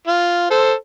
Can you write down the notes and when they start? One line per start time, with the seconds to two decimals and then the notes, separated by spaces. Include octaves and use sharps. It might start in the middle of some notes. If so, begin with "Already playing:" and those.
0.08 F4
0.51 A4 C5